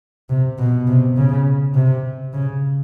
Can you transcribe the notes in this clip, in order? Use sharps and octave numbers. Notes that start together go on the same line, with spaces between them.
C3
B2
C3
C#3
C3
C#3